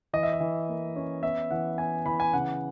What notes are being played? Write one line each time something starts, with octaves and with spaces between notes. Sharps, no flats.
E3 D#5
E5
D#5
E3
A#3
C#4
B3 E5
E3 F#5
B3 G#5
E3 B5
G#5
C#3 F#5